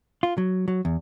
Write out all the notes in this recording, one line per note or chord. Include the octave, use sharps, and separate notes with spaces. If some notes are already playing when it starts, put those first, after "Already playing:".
F4
F#3
F#3
E2